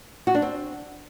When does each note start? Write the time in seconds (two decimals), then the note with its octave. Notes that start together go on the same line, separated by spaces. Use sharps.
0.27 F#4
0.35 D4
0.42 C4